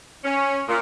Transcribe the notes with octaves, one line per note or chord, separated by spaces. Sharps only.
C#4
A#2